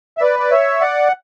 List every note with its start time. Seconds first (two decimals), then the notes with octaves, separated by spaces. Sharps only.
0.18 E5
0.22 B4 D5
0.39 D5
0.51 C#5 E5
0.81 D5 F#5